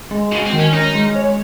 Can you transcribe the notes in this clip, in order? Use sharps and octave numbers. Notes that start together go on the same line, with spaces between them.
G#3
C#3 F#4
C4
D#3
C#4
C#4 D#4
G#3
C#5